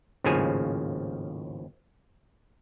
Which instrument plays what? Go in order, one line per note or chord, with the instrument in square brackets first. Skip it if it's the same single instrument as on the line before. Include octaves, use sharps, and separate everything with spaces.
[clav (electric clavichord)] G#1 D#2 A2 C#3 F3 G#5